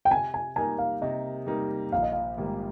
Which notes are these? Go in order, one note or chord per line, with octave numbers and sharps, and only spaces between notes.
G5
C3 G#5
G#5
G3 A#3 D#4 A#4 G#5
F5
C3 D#5
G3 A#3 D#4 A#4
A#1 F5
D#5
F5
G#2 D#3 G3 A#3